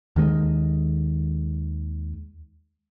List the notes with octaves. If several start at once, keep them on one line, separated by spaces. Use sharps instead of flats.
D#2 D#3 G#3